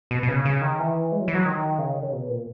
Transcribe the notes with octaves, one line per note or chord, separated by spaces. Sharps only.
B2
B2
C#3
C#3
D#3
E3
G#3
F#3
E3
F#3
D#3
C#3
D#3
C#3
B2
A#2